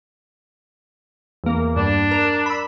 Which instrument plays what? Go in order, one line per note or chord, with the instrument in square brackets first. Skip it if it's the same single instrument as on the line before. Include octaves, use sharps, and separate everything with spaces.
[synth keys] E2 A#3
[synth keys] G2 [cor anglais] D4
[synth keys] A#4
B5 E6